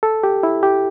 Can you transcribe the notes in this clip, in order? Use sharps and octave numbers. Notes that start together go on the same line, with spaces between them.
A4
G4
E4
G4